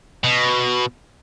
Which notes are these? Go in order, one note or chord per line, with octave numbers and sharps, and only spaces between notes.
B2